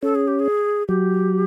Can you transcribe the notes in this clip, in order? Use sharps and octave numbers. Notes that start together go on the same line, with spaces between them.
C#4 A4
G#4
G4
G#4
F#3 G4